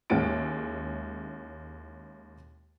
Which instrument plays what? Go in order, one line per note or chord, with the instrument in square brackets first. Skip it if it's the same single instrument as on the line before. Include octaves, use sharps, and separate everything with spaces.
[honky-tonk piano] D#2 G#3 C#4 E4 A6 D7